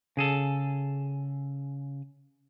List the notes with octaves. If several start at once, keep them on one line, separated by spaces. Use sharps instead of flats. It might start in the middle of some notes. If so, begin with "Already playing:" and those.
C#3 G#4 A4